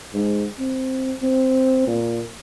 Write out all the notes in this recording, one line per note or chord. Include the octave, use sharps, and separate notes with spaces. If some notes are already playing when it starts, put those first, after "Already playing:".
G#2
C4
C4
A#2